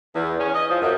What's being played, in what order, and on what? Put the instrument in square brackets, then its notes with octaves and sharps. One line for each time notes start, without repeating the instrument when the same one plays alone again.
[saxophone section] E2
C#4
D#5
F3
F#2